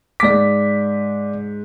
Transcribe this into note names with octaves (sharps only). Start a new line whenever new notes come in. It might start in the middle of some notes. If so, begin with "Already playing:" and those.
G#2 D5 D6 B6